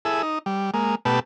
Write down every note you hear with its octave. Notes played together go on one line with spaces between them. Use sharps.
E4 G#4 A4
D#4
G3
G#3 A#3
B2 A3 G4 B4 A5